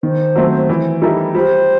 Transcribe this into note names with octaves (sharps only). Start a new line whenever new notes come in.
D#3 C5
F#3 A3 C4
E3
G3 D#4 A4 E5
G3 C5